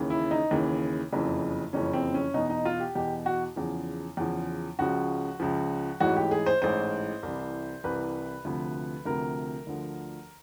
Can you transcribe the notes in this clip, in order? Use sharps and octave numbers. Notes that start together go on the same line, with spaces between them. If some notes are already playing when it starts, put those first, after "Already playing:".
Already playing: D#2 C#3 E3
E4
D#4
D#2 C#3 E3
F#1 F2 C#3 E3
F#1 F2 C#3 E3 C#4
C4
C#4
E2 B2 D#4
D#4
F4
G4
E2 B2 G4
F#4
E2 C#3 F3
E2 C#3 F3
C#2 C#3 F3 F#4
C#2 C#3 F3
A1 G#2 E3 F#4
G4
G#4
C5
A1 G#2 E3 C5
C2 C3 E3
C2 C3 E3 B4
D2 C3 F3
D2 C3 F3 A#4
D2 D3 F3